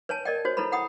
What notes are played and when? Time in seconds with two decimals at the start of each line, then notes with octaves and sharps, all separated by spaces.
0.09 B4 C#5 G#5 A5
0.25 A#4 D5 D#5 G5
0.45 F#4 C5 C#5
0.57 E4 A4 B4 A#5 B5
0.72 F#5 G5 B5 D#6